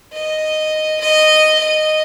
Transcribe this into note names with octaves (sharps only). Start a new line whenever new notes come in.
D#5
D#5
D#5